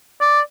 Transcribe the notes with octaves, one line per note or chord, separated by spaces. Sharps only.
D5